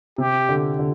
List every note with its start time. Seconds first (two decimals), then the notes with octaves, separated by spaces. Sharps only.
0.18 C3 G4
0.49 D3
0.79 D3